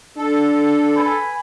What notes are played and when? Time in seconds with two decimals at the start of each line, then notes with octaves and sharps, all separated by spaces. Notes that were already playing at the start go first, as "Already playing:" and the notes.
0.17 D4 A4
0.94 B4 G#5 B5